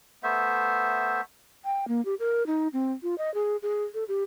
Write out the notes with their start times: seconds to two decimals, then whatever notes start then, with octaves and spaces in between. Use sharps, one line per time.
0.23 A3 B3 C5 E5
1.64 G5
1.88 A#3
2.05 G4
2.20 A#4
2.47 D#4
2.73 C4
3.03 F4
3.18 D#5
3.34 G#4
3.63 G#4
3.94 A4
4.08 G4